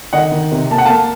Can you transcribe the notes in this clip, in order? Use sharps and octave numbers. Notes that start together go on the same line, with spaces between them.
D#3 D#5 F#5
D#3
C3
A#3 A5
F#5
A#3 F5 A5